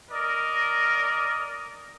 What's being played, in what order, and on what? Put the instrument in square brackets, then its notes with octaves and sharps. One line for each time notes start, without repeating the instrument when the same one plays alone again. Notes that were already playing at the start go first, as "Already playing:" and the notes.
[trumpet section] A#4 D5 D#5